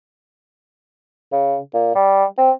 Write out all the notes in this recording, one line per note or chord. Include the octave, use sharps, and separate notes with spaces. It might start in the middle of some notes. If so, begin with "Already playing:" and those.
C#3
A#2
G3
C4